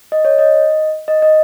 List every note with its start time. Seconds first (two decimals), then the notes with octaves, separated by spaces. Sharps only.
0.12 D#5
0.25 C#5
0.38 D#5
1.08 D#5
1.22 D#5